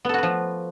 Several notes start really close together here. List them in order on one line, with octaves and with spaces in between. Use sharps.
B3 A4 F#4 B4 F3